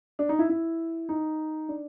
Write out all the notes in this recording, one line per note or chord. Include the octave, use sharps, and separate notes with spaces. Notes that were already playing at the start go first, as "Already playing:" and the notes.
D4
D#4
E4
E4
D#4
D4